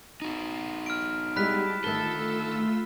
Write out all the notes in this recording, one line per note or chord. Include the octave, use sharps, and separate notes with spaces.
D#4 F#4
F6 D7
G3 G#3 E4 G4 A5 B5 F#6 B6
D2 D#3 A3 F4 A4 E5 E6 G7